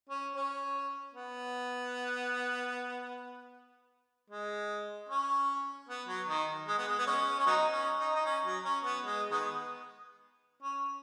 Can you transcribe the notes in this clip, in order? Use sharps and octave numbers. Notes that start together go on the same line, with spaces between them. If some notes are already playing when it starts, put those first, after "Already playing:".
C#4
C#4
B3
G#3
C#4
B3
F#3
D#3
G#3
B3
G#3
B3
G#3 C#4
C#4
F#3 B3 D#4
C#4
D#4
D#4
C#4
F#3
C#4
B3
G#3
D#3 G#3 B3
C#4